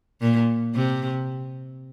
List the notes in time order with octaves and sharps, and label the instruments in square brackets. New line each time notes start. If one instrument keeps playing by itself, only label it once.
[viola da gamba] A#2
C3